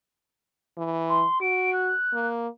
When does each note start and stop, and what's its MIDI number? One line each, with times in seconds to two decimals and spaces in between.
0.77 1.24 52
1.09 1.39 84
1.41 1.92 66
1.41 1.70 98
1.73 2.27 90
2.13 2.48 58